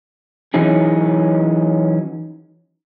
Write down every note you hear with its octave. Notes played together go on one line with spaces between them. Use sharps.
E3 F#3 C#4 D#4 G#4